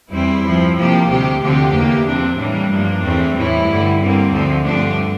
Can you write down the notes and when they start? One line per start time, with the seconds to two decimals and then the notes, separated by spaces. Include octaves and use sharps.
0.12 E2 E3 G3 C4 E4
0.44 G2 F3 C4
0.77 C3 F3 A#3 G4
1.09 D2 C3 G3 G4
1.41 D2 D3 F3 C4 G4
1.74 E2 E3 A#3
2.07 C3 F3 C4 D4
2.38 A2 E3 G3 A#3 D4
2.71 G2 F3 A#3
3.03 E2 E3 A3 C4
3.35 A2 E3 G3 E4
3.67 G2 D3 G3
4.00 G2 D3 G3 A#3 C4
4.32 D2 D3 F3 A3
4.64 G2 D3 F3 A3 C4 D4